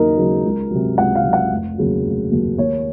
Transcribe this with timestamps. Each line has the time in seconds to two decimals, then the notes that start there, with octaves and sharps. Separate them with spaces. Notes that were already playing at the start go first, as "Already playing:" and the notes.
Already playing: D#2 C#3 F#3 D#4 A#4
0.18 C#3 F#3
0.44 C#2
0.71 C3 F#3
0.98 C#2 F#5
1.15 F5
1.24 C3 F#3
1.33 F#5
1.51 F1
1.78 D#2 C#3 F#3
2.05 F1
2.31 D#2 C#3 F#3
2.58 D#2 C#5